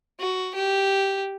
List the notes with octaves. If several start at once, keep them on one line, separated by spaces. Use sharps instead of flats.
F#4
G4